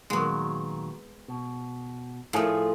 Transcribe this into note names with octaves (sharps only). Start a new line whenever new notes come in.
A#2 D#3 F#3 G#3 B3
B2
A2 F3 A3 F4 G#4